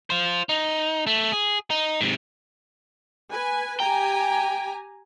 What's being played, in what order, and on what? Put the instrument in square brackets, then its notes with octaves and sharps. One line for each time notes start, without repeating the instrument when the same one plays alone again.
[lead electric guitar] F4 C5
D#4
A3
G#4
D#4
G#2 C3
[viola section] B4 G#5
[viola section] G4 G#5 A#5 [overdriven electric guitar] G5